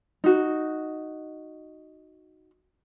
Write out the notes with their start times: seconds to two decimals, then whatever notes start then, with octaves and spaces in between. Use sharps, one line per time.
0.24 D#4 F#4